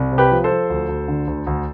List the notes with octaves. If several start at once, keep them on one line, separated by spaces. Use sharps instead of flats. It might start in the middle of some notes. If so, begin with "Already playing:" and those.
Already playing: C2
C3
G4 B4
F3
A4 C5
F3
D2
D2
D3
D2
D2